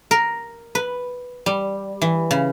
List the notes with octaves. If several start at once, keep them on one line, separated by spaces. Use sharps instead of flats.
A#4
B4
G3
E3
C#3